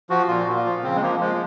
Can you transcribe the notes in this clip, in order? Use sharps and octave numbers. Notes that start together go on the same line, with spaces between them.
F3 F#4
A#2 F4
A#2
F4
F3
C#3 C4
G#3
F3 A#3
F3 G#3